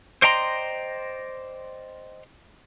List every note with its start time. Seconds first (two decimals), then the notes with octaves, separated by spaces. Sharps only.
0.22 C5 D5 D#5 G5 A#5 C6